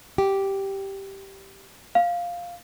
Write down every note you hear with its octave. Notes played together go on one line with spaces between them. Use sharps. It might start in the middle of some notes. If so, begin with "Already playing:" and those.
G4
F5